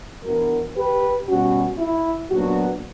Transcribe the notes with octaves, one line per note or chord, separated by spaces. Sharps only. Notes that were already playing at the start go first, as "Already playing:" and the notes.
E3 B3 D4 F#4 A#4
G4 B4
B2 G3 C#4 F#4
E4
A#2 F#3 B3 D4 F#4